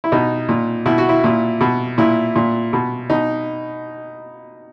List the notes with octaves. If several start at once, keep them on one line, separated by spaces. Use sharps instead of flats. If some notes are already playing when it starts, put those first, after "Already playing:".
E4
B2 D#4
A#2
B2 E4
F#4
E4
A#2
B2
A#2 E4
A#2
B2
B2 D#4